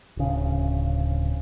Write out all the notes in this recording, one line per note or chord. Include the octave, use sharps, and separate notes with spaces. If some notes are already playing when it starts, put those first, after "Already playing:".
D1 C#3